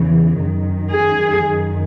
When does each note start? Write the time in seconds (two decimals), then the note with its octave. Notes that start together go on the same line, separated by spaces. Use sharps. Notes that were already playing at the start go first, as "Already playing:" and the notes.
Already playing: E2 C#3 E3
0.40 F#2 D#3
0.92 G#4
1.44 F#2 D#3